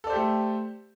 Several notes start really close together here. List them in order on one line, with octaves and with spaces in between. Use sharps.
A4 D5 C5 G4 A3